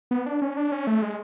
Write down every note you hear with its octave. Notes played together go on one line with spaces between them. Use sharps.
B3
D4
C#4
D4
C#4
A3
G#3